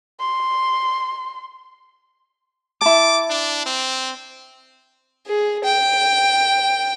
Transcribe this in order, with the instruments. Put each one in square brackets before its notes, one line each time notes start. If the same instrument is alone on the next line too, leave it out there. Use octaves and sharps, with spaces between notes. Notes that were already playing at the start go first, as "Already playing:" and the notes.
[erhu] C6
[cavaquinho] E4 A5 [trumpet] D6
[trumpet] D4
C4
[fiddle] G#4
G5